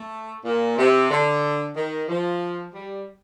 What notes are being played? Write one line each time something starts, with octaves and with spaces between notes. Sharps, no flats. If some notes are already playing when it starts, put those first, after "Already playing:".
Already playing: A3
A#2
C3
D3
D#3
F3
G3